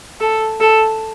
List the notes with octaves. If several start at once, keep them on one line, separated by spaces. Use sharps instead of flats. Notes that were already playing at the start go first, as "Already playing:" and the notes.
A4
A4